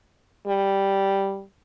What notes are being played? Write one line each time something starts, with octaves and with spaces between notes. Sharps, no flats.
G3